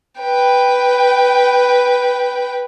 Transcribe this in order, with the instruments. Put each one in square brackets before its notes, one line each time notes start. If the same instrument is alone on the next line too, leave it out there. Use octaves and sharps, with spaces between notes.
[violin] B4 G5